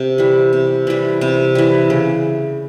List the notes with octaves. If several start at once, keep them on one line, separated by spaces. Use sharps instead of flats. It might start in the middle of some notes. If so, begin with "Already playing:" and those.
Already playing: C3
E3 G3
C3
E3 G3
C3
E3 G3
C#3